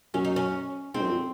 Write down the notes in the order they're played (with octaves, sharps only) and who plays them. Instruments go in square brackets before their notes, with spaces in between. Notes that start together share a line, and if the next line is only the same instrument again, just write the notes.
[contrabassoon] F#2 [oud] C#4
[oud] D#4
C#4
[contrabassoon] G#2 [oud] C4
[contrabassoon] F#2
F2